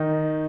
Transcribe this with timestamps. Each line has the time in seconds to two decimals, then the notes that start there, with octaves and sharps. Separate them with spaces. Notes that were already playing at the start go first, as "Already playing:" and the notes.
Already playing: D#3 D#4